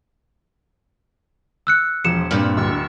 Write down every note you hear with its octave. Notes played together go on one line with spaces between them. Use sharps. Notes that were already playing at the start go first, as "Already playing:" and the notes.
E6 F#6 C#7
E1 F3 C#7 E7
G2 A#2 C4 B5 E6 F6
D1 C#6 E6